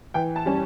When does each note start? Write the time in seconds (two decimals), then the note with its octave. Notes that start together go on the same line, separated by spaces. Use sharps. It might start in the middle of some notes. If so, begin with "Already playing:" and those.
0.14 E3 G5
0.36 A5
0.46 G3 C#4